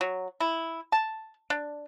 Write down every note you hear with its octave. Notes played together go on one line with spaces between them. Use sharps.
F#3
E4
A5
D4